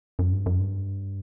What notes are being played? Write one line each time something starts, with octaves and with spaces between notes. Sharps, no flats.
F#2
G2
F#2
G2